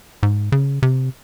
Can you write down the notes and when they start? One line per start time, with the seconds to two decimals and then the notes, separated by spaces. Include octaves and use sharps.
0.23 G#2
0.52 C#3
0.83 C3